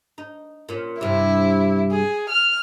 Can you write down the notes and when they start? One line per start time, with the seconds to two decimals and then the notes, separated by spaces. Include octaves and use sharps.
0.18 D#4
0.69 A#2 C#4
1.01 G2 C3 E4
1.91 G#4
2.30 F6